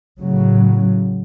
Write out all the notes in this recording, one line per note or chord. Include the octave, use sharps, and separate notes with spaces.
A2 C#3 F#3